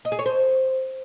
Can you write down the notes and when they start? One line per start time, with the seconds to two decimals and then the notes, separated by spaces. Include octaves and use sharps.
0.05 D#5
0.12 G#4
0.19 C#5
0.26 C5